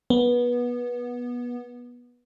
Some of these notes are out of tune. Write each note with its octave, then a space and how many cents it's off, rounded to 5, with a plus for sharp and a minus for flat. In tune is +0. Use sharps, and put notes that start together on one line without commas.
B3 -20